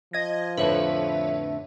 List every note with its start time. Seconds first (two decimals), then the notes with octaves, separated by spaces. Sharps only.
0.13 F3 D#5 G#6 A#6
0.57 F2 A2 D3 B4 C#5 E5